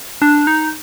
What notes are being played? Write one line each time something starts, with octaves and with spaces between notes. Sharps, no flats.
D4
D#4